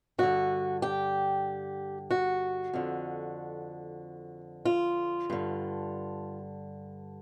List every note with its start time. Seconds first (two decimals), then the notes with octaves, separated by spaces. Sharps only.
0.18 G2 D3 F#4
0.82 G4
2.11 F#4
2.74 F2 D3
4.65 F4
5.30 G2 D3